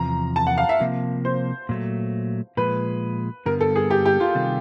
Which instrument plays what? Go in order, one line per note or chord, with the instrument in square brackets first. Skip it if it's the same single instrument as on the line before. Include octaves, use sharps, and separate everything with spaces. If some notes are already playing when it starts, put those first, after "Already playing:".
Already playing: [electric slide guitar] E2 C3 F3 [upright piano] A#5
[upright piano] A5
F#5
F5
E5
[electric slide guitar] C3 F3 A#3
[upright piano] C5
[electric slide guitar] A#2 F#3 A3
[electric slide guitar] A#2 F3 G#3 [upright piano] B4
[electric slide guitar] G2 D3 G3 B3 [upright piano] A#4
[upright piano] A4
G#4
G4
G4
F4
[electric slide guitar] C3 D#3 G3 C4